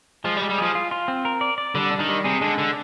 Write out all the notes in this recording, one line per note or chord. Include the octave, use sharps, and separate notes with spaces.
F3 G#3
G3
G#3
G3
F3 G#4
F4
F4
C4
A#4
D5
D5
D3 G3
D4
D#3
G3
C3 G#4
D3 G#3
D3 D4